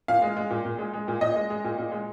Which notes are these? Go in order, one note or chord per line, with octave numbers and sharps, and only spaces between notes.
A#2 F5
G#3
G#3
A#2
A#2
G#3
G#3
A#2
A#2 D#5
G#3
G#3
A#2
A#2
G#3